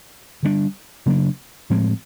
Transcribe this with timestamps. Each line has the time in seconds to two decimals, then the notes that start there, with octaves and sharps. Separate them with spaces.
0.43 D3 G3 B3 D4
1.06 C#3 F#3 A#3 D4
1.70 A2 F3 G#3 C4